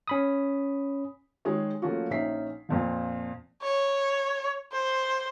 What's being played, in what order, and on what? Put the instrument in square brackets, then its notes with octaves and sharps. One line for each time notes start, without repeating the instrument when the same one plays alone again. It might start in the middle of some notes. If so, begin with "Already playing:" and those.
[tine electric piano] C#4 B5 D#6
[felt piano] D#3 G#3 G#4 C#5
F3 A3 A#3 C#4 F4 F#4
A#1 C#4 D#4 E5 B6 C7
F2 A#2 F3
[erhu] C#5
C5